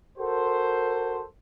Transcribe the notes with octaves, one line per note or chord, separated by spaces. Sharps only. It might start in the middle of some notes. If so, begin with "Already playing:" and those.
F#4 A4 A#4 C5